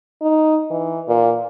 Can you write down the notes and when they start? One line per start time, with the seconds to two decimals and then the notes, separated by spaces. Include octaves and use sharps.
0.22 D#4
0.71 E3
1.08 A#2